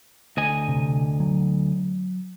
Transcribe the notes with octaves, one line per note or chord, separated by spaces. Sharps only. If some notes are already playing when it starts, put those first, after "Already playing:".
D2 D#5 G#5
C3
F#3